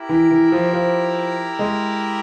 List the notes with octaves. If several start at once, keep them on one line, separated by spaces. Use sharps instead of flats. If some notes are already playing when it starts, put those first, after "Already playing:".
Already playing: E4 G4 A#4
E3
E3
F3
F3
G#3